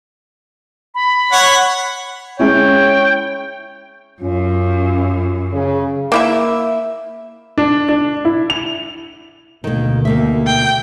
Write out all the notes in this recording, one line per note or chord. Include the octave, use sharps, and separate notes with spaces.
B5
C#5 F#5
G#3 C#4 E4 C#5 G5
F#2 C#4 F4
C#3
A#3 E4 E5
D4
D4
E4
F7
D2 B2 D#3 A#3
D#2 A#3 E5
G5